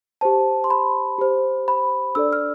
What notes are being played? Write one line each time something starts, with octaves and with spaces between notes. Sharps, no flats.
G4 C5 A5
C6
B5
G4 C5
B5
D4 A4 D5 E6
F6